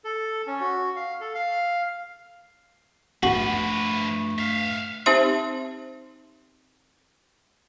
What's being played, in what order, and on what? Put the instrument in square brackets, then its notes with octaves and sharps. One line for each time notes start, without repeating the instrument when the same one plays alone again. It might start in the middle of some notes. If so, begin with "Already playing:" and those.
[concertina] A4
C#4
F#4
F5
A4
F5
[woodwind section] G2 A3 [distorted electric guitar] F3 B4 [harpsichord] F#4
[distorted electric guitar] E5 F5
[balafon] C4 D#4 G4 C5 E5 C6